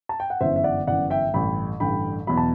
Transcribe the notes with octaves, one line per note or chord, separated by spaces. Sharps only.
A5
G5
F#5
G1 F#2 E3 C5 E5
E5
D5 F#5
G1 F#2 E3 D5 F#5
E5 G5
A1 G2 D3 G5 B5
A1 G2 D3 G5 B5
E2 B2 F#3 B5
A5